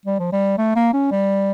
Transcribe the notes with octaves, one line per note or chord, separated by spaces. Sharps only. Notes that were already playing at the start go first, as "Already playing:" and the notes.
G3
F3
G3
A3
A#3
C#4
G3